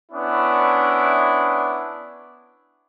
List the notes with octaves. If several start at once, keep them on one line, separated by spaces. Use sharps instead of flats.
B3 C#4 D4 E4